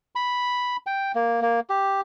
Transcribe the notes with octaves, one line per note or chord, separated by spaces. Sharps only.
B5
G5
A#3
A#3
G4